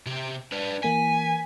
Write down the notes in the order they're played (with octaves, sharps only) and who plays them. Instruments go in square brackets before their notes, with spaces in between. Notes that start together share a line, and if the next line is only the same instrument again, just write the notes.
[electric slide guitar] C3 G4
D4 B4
[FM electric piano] E3 A#3 B6 [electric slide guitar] G#5